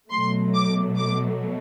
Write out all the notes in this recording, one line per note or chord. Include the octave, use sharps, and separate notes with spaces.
B2 F#3 A3 C6
D6
D6